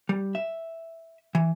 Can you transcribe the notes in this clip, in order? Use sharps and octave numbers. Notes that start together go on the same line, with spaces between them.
G3
E5
E3